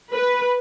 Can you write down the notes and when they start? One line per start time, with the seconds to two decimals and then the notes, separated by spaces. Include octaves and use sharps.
0.12 B4